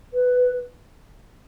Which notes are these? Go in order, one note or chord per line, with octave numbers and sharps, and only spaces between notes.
B4